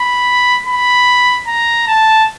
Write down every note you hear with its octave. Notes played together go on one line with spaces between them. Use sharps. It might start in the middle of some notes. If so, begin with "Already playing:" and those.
Already playing: B5
B5
A#5
A5